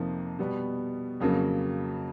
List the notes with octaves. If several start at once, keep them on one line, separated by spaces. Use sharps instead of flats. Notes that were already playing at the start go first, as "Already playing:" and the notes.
Already playing: F2 C3 F3 A#3 D#4
B2 G3 B3
F2 C#3 F#3 A#3